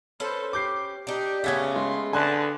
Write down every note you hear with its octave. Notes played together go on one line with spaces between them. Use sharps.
C#4 A4 B4 C5
G4 D6 G6 C7
D4 D#4 G4
C#3 A3 B3 C#4 G#6 B6
G#3 C6
D3 B4 G#5 A5 C6 F#6